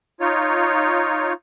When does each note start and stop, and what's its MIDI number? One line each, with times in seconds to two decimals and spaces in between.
0.20 1.33 63
0.20 1.33 65
0.20 1.33 73